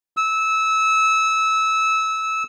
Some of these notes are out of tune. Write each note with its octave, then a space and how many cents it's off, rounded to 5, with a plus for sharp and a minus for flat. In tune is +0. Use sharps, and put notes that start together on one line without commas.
E6 -20